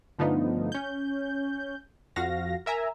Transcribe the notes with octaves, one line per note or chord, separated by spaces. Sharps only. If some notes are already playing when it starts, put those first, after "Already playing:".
G2 D3 F3 A3 B3 D#4
C#4 G6
F2 F3 F#4 F5 A#6
A#4 E5 G#5 A#5